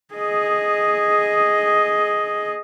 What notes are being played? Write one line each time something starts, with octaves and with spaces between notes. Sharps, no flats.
G#4 D#5